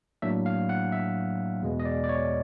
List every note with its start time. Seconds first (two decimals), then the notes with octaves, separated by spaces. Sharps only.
0.22 A2 F#3 A#3 D4 E5
0.46 F5
0.69 F#5
0.92 E5
1.62 E2 B2 G#3 B3
1.79 D#5
1.85 D5
2.04 D5
2.09 C#5